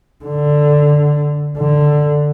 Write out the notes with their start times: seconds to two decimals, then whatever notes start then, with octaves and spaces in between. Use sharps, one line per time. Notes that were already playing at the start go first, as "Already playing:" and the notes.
0.24 D3
1.57 D3